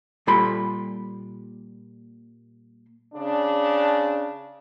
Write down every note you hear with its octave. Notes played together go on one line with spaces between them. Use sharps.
A#2 G3 F4 A4 B5 C6
C#3 D4